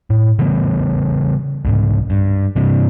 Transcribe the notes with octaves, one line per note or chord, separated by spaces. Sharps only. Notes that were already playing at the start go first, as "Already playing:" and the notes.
A2
C#3 E3 G3 B3
C2 G#2
G2
G2 C3 E3